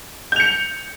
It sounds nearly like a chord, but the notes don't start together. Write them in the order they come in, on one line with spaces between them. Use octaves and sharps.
G6 F7 C#7